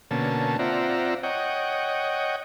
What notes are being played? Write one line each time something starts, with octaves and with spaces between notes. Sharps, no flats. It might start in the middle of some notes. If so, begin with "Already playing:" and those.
B2 D3 A#3 C#4 A5
C4 F4 D5 E5 F#5 A#5
C#5 D#5 F#5 G5